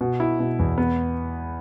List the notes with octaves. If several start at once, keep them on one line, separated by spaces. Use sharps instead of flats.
B2
E4
B2
E2
B3